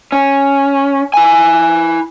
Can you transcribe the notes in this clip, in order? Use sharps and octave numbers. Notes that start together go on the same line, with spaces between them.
C#4
E4 G#5